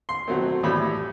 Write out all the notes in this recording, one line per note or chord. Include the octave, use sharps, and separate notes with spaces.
C6
B2 F#3 A3 C4
A2 E3 G3 B3 B5